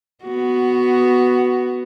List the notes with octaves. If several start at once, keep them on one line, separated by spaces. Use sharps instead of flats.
B3 F#4